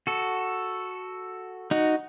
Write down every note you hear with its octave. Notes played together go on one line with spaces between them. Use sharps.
F#4 A4
D#4 F#4